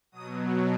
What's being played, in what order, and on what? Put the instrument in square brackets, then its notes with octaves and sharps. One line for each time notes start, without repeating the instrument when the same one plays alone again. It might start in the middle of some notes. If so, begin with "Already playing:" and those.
[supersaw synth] B2 F#3 D#6